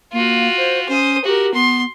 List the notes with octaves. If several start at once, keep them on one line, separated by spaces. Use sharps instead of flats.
A#3 F4 F#4
C5
C#4 C5 D#6
F#4 G4 A#4
B3 C6